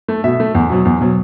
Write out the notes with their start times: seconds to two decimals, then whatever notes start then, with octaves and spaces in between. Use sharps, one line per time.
0.08 A3
0.24 B2 E5
0.40 A3
0.55 E2
0.70 B2 F#3
0.85 E2
1.01 B2 F#3